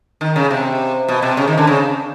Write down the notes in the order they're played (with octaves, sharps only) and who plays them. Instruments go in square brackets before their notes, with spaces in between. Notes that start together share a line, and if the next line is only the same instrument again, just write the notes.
[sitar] D#3
C#3
C3
B2
C3
C#3
D#3
D3
C#3